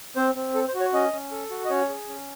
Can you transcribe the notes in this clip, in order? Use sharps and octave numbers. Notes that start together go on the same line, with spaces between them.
C4 C5
C4
A4
C5
F#4
C#5
C#4 D#5
C#4
A4
F#4
D#5
C#4 C#5
G#4
C#4